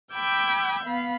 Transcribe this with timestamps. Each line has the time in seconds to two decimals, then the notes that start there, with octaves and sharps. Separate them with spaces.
0.13 G5 B5 D6 E6 G6 G#6
0.83 B3 F5 B5